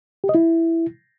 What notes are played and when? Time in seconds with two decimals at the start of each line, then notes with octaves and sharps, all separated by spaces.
0.24 G4
0.29 D#5
0.35 E4